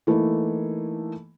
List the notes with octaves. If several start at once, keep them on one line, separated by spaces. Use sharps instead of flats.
E3 A3 A#3 D#4 E4